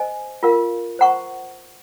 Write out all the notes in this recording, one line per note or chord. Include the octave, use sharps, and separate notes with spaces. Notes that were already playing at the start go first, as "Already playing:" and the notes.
Already playing: C5 D#5 G#5
F4 A#4 F5
C5 F#5 A#5 C#6